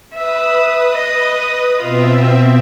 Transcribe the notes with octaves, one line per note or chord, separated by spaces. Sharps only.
B4 E5 D#6
D#5
B2 C4 F4 E5